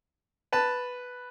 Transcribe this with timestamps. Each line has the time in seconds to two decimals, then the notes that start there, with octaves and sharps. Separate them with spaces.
0.53 B4 A5